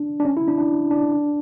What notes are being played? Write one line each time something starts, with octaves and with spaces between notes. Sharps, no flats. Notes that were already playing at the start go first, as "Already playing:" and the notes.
Already playing: D4
D4
C#4
E4
D4
D4
D4
D4